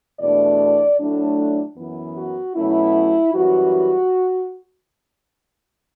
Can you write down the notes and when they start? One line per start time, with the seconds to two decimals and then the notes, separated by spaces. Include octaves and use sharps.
0.20 E2 B2 A3 D4 D5
1.00 A2 F#3 A3 D4
1.77 F#2 E3 B3
2.17 F#4
2.56 B2 F#3 A3 C#4 E4
3.34 F#2 E3 G3 F#4